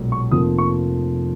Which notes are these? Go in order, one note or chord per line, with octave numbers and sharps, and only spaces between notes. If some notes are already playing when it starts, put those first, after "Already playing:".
Already playing: B1 A#2 G#3
C#6
F1 F2 F3 A#3 D#6
C#6